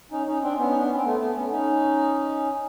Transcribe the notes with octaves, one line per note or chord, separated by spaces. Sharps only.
C#4 D#4
C#4 D#4
C4 D4
B3 C#4
D#4
D4
C#4
C4
A3 B3
A3 B3
B3 C#4
C#4 D#4